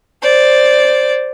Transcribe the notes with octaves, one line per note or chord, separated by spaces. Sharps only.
C5 D5